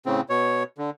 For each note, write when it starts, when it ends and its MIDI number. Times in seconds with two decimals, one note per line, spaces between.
0.06 0.21 45
0.06 0.21 49
0.06 0.21 60
0.29 0.63 47
0.29 0.63 73
0.78 0.90 50